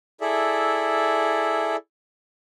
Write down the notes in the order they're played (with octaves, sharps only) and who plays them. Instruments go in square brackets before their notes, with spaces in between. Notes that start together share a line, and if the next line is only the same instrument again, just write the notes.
[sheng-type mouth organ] E4 G#4 A4 D5 E5